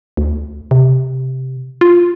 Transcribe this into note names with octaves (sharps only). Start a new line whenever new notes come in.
D2
C3
F4